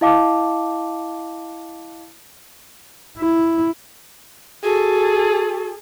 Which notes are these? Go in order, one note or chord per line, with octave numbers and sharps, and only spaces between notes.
E4 D#5 F5 A5 D6
E4
F#4 G#4 A4